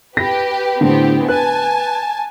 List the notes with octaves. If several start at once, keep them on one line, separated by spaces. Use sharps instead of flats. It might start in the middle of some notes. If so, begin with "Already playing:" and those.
G4 B4 A#6
A2 D3 B3 C4 G4
B4 G#5 A5 F#6